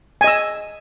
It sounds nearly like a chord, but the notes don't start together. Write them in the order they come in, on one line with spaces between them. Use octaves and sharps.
G#5 D#5 E6